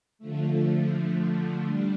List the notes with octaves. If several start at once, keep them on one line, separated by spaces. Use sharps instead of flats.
D3 F3 A3
G3 D4